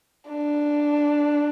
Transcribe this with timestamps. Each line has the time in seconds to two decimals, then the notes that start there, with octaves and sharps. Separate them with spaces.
0.29 D4